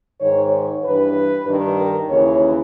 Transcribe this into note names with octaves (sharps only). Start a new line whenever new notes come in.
G#2 D#3 C#5
C#5
G2 E3 B4
G2 D#3
A#4
D#2 C#3 E3 C#5